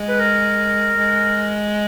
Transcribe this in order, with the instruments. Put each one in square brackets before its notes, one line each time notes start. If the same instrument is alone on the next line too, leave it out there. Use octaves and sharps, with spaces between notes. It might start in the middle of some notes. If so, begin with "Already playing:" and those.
Already playing: [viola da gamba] G#3
[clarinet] B4
A#4
[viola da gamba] G#3